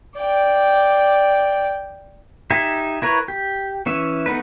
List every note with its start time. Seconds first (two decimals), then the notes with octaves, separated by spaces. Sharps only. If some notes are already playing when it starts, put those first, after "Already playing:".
0.18 D5 G5
2.50 D#4 G4 E5 G#5
3.02 E4 A#4 B4 C#5
3.28 G4
3.86 E3 C#4 E5
4.26 A3 B3 D#4 B4